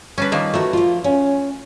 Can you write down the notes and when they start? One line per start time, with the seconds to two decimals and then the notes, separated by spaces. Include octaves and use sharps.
0.18 G3 C#4 D4 B4
0.32 D#3 F3 A#3
0.54 A3 F#4 A#4 B4
0.73 F3 F4
1.04 C#4